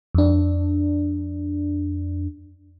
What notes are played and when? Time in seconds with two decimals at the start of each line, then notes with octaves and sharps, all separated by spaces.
0.15 F2 D4